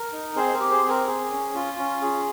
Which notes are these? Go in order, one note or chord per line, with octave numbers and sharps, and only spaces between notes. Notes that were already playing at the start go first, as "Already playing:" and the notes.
Already playing: A#4
D#4
C4 G#4 C5
A#4
G4
G#4 C5
C4
A#4
G#4
C#4
F4
C#4
G#4